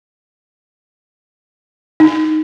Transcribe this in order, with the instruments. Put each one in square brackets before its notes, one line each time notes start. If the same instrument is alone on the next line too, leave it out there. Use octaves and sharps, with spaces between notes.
[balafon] D#4